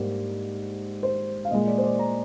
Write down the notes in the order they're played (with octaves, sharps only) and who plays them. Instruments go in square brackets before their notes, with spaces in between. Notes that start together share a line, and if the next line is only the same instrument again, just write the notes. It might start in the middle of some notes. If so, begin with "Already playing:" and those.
Already playing: [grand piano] G#2 G3 A#3
C5
F5
A#2 G#3 D#5
D5
C5
D5
A#5